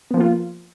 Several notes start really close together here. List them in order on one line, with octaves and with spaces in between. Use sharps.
B3 F3 A#3 F4